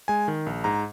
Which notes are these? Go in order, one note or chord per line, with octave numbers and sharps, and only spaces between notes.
G#3 G#5
D#3
A#1
G#2 A#5